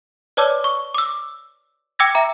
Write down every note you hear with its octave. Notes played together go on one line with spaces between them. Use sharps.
B4 C#5 D5 A5 D6 E6
C#6
D6 E6
G5 D6 E6 G#6 A#6
E5 G5 A#5